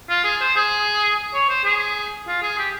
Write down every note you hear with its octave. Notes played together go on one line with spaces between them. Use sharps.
F4
G#4
C5
G#4
C#5
C5
G#4
F4
G#4
G4